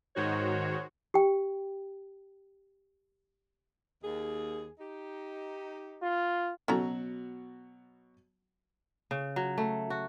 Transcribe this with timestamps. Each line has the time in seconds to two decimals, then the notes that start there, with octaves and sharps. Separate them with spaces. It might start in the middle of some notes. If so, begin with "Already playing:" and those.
0.16 G#2 D#3 F#4 C5 C#5
1.14 G4 G5
4.03 D#2 G#4
4.78 D#4 G4
6.02 F4
6.68 B2 F#3 C#4 F#4 A4 A#5
9.11 C#3
9.36 F#3
9.58 A3
9.90 F#4